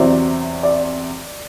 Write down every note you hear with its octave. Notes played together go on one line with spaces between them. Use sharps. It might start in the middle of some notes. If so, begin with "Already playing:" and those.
Already playing: E2 C3 F#3 C4 E4 D5
D5